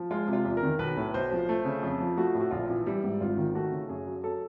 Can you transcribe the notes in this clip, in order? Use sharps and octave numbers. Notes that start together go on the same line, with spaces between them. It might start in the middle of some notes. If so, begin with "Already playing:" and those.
Already playing: F3
G#3 F4
C3
F4
E2
A#4
D#3
B1 B4
A2
B1 C5
F3
A3
C#3
F2
F3
A3 F#4
A2
F#4
A#1 F4
E3
G3 E4
G#2
G#1 F4
D#3
A3 F#4
C#3
F#2 G#4
F#3
F#3 A4